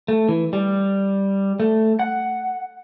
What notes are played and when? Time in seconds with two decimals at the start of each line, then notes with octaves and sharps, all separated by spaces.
0.08 A3
0.29 E3
0.53 G3
1.60 A3
1.99 F#5